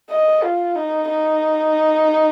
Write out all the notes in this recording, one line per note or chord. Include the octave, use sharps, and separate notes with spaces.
D#5
F4
D#4
D#4